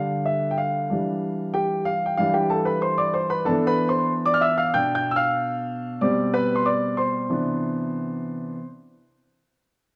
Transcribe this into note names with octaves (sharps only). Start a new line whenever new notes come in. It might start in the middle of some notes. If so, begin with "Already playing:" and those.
Already playing: D3 G3 D4 F5
E5
G5
F5
E3 G3 D4
G4 G5
F5
G5
E3 G3 D4 F5
G4 G5
A4 A5
B4 B5
C5 C6
D5 D6
C5 C6
B4 B5
E3 B3 D4 A4 A5
B4 B5
C5 C6
D5 D6
F6
E5 E6
F5 F6
B2 B3 D4 G5 G6
G5 G6
E6
F5 F6
B2 G3 C4 D5 D6
B4 B5
C6
D5 D6
C5 C6
C3 E3 B3 D4